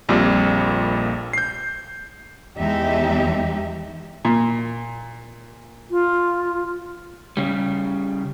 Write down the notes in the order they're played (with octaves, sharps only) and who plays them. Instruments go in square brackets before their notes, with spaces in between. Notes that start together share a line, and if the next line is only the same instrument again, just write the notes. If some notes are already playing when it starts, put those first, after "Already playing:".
[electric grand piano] A#1 F2 A#2 G3
G6 C7
[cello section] E2 G#3 D#4 G4 E5
[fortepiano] A#2
[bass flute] F4
[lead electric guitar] C#3 G3